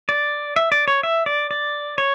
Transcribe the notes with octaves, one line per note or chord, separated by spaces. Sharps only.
D5
E5
D5
C#5
E5
D5
D5
C#5